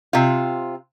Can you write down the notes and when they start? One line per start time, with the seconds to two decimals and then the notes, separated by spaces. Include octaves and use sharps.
0.13 C3 F4